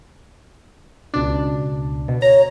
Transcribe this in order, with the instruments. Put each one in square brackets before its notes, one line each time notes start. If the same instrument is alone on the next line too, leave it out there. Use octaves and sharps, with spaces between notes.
[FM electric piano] C#2 B2 D4
B2
[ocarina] C#5 [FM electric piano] A#5